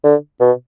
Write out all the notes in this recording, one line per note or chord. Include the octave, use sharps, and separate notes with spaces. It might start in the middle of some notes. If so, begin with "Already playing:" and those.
D3
B2